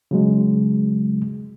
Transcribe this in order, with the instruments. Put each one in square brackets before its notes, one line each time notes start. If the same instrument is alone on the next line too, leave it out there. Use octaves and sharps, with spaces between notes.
[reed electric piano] C#3 F#3 G#3